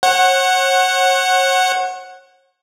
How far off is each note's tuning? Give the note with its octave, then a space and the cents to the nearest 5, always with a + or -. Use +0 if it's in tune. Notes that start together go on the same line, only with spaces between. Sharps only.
C#5 -40 F#5 +0